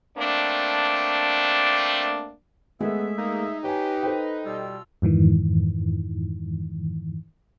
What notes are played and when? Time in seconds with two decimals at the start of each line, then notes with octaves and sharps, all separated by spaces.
0.17 A3 A#3 C4 D4
2.81 G#3 A3 B3 G#4 E5
3.18 A#3 D#4
3.64 G4 B4 C#5 G#5
4.03 A4 C5 G5
4.45 B2 G3 F4 E6
5.02 F2 G#2 D#3 E3